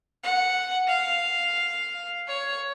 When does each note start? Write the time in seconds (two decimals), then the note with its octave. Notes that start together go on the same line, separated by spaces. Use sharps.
0.23 F#5
0.87 F5
2.27 C#5